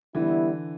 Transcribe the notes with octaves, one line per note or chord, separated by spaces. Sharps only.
D3 E3 G3 B3 E4